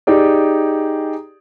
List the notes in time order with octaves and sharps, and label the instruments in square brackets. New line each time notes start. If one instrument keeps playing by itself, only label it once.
[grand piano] D#4 G4 G#4 D5